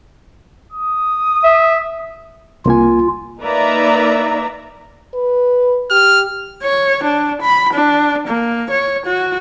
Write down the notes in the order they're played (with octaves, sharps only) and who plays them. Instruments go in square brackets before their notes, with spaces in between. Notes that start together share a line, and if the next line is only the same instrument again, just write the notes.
[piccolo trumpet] D#6
[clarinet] E5
[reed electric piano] C2 A#3 G#5 [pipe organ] F4
[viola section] A#3 D#4 B4 D5 E5 A#5
[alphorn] B4
[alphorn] G4 [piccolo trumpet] F6
[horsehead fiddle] C#5
D4
B5
D4
A#3
C#5
F#4